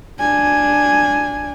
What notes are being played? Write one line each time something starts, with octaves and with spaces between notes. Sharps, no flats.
D4 G#5